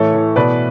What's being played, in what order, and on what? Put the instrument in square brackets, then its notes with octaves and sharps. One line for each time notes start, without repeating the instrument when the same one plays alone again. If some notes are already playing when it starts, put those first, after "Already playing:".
Already playing: [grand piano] A2 E3 A4 C#5
E3
B2 B4 D5